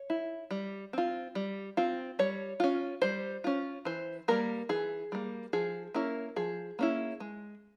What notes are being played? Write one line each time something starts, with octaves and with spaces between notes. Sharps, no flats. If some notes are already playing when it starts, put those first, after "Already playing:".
Already playing: C#5
E4
G3
C4 F4
G3
C4 F4
G3 C#5
C#4 F4
G3 C5
C#4 F4
E3 C5
G3 A#3 A#4
E3 G#4
G3 A#3
F3 G#4
A#3 C#4 E4 A#4
F3 G#4
A#3 C#4 E4
G#3